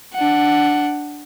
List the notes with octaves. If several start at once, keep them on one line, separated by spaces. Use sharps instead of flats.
D4 F#5